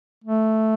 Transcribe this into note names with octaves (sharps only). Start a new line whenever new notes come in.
A3